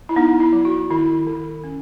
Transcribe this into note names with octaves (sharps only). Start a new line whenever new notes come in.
E4
B3 D#4
E4
F#3
F#4
D#3 E4
D#3
C#4